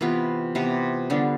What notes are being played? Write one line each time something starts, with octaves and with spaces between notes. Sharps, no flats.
C3 E3 B3 F4
C3 E3 B3 F4
D3 G3 B3 D4